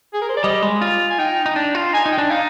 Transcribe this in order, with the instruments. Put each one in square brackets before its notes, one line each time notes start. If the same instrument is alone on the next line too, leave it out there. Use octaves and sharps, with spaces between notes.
[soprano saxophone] G#4
A#4
C5
D5
[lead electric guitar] G3 [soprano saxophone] D#5
[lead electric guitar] G#3
F4
[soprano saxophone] G#5
[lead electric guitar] D#4 [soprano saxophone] G5
[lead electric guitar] D#4
D4
F4
[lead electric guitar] D#4 [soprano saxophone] G#5
[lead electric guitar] D#4
[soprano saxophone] G5
[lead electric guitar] D4
[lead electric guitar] D#4 [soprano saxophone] F5